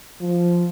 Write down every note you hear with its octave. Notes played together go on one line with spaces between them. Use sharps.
F3